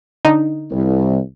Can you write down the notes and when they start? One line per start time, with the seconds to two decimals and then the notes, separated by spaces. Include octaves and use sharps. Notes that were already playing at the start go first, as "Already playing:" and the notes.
0.25 D3 D#4
0.71 C2